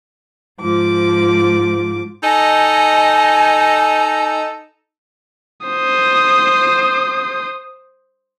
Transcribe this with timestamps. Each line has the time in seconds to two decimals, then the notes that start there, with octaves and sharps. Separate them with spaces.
0.61 G#2 F3 D6
2.24 D#4 A4 D#5 G#5
5.67 C5 D#6